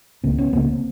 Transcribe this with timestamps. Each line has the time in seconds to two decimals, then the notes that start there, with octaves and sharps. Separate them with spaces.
0.24 C#2 C#3 A#3 C4
0.38 B3 C#4
0.53 C#2 C#3 A#3 C4